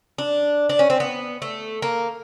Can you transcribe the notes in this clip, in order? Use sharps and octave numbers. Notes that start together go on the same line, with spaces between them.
D4
D4
C#4
C4
B3
A3
A#3